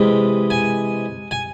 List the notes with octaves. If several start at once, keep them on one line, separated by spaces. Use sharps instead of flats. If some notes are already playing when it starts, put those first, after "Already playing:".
Already playing: C3 E3 G#3
G#5
G#5